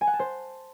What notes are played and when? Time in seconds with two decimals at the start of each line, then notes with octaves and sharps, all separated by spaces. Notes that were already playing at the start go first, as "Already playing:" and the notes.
0.01 G#5
0.07 F#5
0.13 A5
0.19 C5